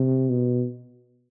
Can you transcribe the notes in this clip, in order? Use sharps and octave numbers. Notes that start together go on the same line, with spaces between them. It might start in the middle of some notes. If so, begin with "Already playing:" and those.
Already playing: C3
B2